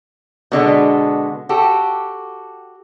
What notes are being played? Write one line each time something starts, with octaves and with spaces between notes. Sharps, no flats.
B2 D3 G#3 B3
F#4 G4 A4